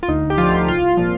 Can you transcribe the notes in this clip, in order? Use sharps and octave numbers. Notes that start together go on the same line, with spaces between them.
F4
D2 D#4
G4
F3 F4
D3
C2 F4
A#2 F3